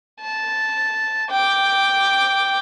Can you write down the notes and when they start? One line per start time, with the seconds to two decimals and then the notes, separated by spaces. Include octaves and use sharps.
0.21 A5
1.30 G5 D6